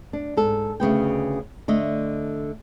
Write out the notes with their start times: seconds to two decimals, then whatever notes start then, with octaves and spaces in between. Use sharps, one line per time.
0.13 D4
0.37 G#2 A4
0.80 D2 C#3 B3 G5
1.68 D3 A3 D#5